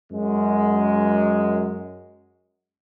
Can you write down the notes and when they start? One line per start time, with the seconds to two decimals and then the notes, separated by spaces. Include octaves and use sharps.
0.13 F#2 G#3